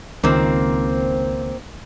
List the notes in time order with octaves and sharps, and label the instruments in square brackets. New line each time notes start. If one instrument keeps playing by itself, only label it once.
[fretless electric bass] C#2 D#3 [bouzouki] A#3 C4